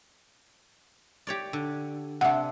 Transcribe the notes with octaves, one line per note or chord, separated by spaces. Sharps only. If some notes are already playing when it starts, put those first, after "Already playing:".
G4 C#5 D5
D3
C3 D4 E5 F#5